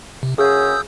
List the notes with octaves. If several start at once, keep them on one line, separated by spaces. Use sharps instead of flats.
C3
F#2 C#3 G#4 D#6 E6 G6